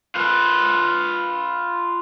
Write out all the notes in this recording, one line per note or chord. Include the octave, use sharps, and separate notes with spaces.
F4 B4